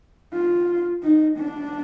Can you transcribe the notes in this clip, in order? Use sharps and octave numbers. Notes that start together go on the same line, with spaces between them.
F4
D#4
D4